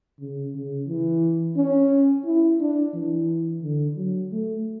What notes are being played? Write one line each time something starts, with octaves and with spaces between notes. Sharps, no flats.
C#3
C#3
E3
C#4
E4
D4
E3
D3
F#3
A3